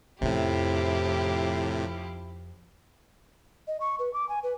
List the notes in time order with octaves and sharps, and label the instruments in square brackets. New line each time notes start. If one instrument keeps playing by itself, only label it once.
[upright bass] F2 C#4 [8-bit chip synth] A2 C3 [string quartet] F3 E4 G4
[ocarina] D#5
C#6
B4
D6
G#5
B4